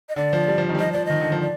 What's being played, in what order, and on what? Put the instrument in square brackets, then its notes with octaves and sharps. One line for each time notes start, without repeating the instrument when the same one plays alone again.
[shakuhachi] D#5
[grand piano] D3 [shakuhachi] D5
[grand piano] F3
G3
F3
D#3
G3
[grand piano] F3 [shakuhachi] D#5
[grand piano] F3 [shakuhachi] D5
[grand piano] D#3 [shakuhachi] D#5
[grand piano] D3
F3
[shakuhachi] D5